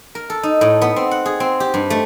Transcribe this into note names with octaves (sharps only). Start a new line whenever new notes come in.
A#4
A4
D#4
A2
B3
C4
F#5
G#4
C4
G4
G2
A3